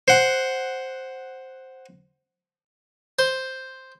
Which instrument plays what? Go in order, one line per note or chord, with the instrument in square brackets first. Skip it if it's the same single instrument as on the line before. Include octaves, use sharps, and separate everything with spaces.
[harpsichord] C5 F#5
C5